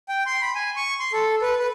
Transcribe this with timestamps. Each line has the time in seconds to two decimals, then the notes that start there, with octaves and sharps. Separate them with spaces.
0.09 G5
0.27 C6
0.42 B5
0.55 G#5
0.76 C#6
1.00 C6
1.13 A4
1.42 B4
1.59 B4